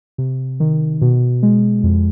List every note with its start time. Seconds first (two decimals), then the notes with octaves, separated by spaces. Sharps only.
0.18 C3
0.60 D#3
1.02 B2
1.43 G#3
1.83 F2